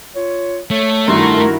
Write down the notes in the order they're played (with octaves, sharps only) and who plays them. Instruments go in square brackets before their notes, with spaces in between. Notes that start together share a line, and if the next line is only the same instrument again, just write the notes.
[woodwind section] F4 C#5
[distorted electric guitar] A3 [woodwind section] C#5
[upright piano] G2 D#3 [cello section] E4 F#4 A#4 [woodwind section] C6